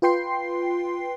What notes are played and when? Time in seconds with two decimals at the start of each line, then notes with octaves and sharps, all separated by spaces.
0.02 F4 B4 G5 C6 C7